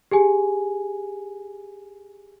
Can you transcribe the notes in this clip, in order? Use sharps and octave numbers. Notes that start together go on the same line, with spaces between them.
G4 G#4 G#5